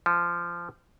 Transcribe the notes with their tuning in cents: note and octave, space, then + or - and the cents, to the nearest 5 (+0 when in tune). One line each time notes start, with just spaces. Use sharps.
F3 -20